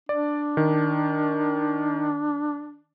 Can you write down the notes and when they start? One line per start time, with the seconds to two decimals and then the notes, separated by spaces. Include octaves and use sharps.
0.09 D4 D5
0.57 D#3